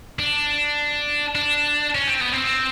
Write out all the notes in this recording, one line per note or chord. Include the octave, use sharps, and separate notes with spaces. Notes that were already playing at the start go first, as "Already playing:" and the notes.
D4
D4
C#4
C4
B3
C4